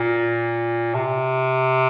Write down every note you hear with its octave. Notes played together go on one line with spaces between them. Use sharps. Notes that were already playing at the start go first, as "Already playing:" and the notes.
Already playing: A#2
C3